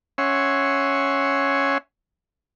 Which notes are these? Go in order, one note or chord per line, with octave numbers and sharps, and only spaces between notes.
C#4 C#5 E5 F#5 G#5 C6